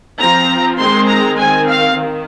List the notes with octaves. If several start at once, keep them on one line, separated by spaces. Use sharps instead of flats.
F3 C4 A#5
D#3 G#3 C4 C6
A#5
D#3 C4 G#5
F5
D#3